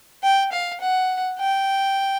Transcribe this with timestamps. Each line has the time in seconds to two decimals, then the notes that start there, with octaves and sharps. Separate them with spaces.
0.23 G5
0.52 F5
0.81 F#5
1.39 G5